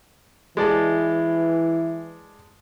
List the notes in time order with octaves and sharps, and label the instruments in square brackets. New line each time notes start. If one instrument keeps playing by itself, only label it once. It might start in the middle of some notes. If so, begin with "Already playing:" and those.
[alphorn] E3 [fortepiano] G#3 D5 A5